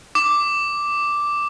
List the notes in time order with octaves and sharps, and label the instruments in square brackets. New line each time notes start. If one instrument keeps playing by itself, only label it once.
[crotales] D6